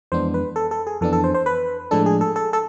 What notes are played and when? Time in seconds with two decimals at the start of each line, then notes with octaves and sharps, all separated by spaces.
0.12 F2 E3 G#3 B3 D4 C5
0.34 B4
0.56 A4
0.71 A4
0.87 G#4
1.01 F2 E3 B3 D4 A4
1.13 A4
1.24 C5
1.34 C5
1.46 B4
1.91 A2 F3 G#3 D4 A4
2.06 G#4
2.21 A4
2.36 A4
2.53 A4